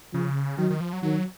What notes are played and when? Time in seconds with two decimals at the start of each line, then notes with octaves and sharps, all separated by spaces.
0.13 C#3 F3
0.58 D#3 F#3
0.70 D#3
0.80 F3
0.93 F#3
1.03 D#3 F#3